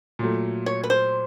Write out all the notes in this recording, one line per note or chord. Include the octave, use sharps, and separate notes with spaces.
A#2 F#3 A3
C#5
B4
C5